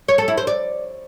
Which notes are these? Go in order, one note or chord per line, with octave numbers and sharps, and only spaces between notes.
C#5
A4
E4
C5
D5